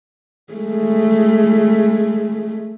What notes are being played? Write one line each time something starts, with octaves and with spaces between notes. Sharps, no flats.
G#3 A3